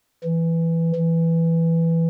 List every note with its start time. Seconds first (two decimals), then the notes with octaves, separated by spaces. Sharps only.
0.25 E3
0.96 E3